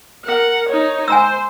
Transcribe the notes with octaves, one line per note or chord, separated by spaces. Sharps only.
A#4 F#5
D#4 C#5
C5 G#5 A#5 E6